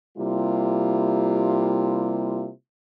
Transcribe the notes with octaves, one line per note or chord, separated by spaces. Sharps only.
C3 G3 A#3 E4 F4